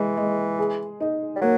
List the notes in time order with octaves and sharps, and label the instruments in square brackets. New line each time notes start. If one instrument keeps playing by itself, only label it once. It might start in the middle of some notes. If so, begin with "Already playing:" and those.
Already playing: [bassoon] E3 [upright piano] G#3
[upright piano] G#3
G#4
D#4
[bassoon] G3
[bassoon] F#3 [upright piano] A#3